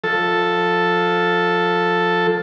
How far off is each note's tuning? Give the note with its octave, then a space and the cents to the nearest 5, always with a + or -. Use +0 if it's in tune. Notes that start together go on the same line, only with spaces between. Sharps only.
F3 +15 A4 +0